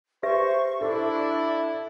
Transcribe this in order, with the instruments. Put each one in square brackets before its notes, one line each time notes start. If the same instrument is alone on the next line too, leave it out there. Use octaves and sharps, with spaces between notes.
[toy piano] G4 B4 E5 [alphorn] C5 [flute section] C#6
[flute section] D4 [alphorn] E4 [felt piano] A4